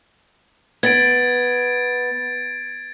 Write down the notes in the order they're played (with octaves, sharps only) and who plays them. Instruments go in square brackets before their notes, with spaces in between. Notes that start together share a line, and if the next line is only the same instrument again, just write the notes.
[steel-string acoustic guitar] B3 [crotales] G#6 A6 D7